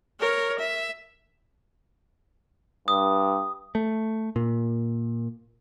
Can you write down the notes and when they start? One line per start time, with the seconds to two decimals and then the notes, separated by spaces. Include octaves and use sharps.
0.20 A#4 C#5
0.59 E5
2.88 G2 D#6
3.75 A3
4.36 A#2